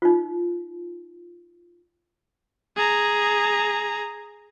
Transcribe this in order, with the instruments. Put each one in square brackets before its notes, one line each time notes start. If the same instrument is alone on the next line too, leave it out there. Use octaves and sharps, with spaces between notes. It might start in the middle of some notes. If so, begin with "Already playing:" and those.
[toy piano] D#4 F4
[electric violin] G#4 A#5